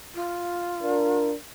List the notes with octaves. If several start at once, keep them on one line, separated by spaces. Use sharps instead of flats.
F4
D4 A#4